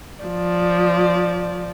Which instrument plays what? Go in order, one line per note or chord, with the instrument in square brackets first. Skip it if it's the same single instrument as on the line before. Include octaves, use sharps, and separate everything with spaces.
[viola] F3 D5